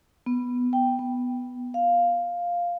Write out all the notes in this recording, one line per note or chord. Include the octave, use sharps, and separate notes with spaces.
B3
G5
B3
F5